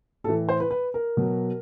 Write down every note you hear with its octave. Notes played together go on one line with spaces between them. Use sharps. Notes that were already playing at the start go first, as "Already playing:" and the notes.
A2 E3 A4
C5
B4
B4
A#4
B2 F#3